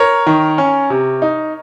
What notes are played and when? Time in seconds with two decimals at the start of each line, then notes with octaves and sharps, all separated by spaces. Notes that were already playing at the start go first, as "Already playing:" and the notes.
Already playing: A#4 C#5
0.27 D#3
0.58 C#4
0.90 C3
1.22 D#4